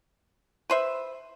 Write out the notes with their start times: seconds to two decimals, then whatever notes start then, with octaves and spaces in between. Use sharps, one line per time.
0.70 B4 C5 E5